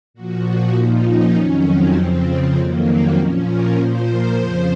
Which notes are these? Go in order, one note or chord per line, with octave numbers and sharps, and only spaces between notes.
A#2 F3 F#4
A#2 F3 D#4
C#4
F2 D#3 F#3
C4
F2 C#3 F3
F2 D#3 F#3 A#3
C4
A#2 F3 C#4
A#4
A#2 F3 C5
A#4
F2 C#3 F3 C5